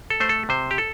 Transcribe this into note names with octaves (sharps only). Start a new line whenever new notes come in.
A4
A3 C5
A4
C3 C5
G4
A4